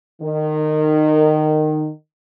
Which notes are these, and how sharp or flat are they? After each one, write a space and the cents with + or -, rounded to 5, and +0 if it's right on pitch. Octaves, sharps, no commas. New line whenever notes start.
D#3 -20